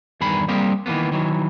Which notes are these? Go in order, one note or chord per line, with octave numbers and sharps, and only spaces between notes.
E2 G2 D#3 G#4 B5
G3 A#3 C4 G4 G#4 A#4
D#3 E3 F#3 A#3 B3
D#3 E3 F#3